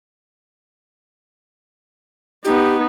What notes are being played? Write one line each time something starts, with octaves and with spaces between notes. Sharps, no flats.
B3 D#4 G4